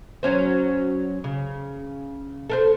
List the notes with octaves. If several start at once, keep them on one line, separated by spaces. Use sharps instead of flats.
F#3 C#4 C5
C#3
A4 A#4 C5